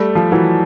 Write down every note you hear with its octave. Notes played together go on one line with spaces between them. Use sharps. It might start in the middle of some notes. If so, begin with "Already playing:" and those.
Already playing: G3 A3
F3
E3 F#3